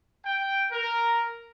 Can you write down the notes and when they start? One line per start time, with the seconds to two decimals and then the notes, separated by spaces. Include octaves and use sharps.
0.25 G5
0.71 A#4